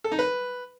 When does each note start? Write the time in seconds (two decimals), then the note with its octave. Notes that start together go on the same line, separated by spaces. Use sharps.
0.04 A4
0.12 D#4
0.19 B4